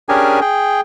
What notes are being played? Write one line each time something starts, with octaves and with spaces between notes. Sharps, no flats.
C#4 D4 G4 G#4 A#4 G#5
G#4 G5